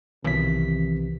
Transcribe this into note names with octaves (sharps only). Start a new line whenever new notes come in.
B1 C3 D#3 E3 B6